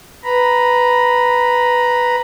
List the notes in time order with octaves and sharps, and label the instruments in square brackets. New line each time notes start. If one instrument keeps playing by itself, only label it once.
[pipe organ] B4 A#5 B5